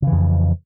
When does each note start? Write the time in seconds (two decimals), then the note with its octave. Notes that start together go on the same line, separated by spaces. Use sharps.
0.02 C#3
0.07 E3
0.12 F2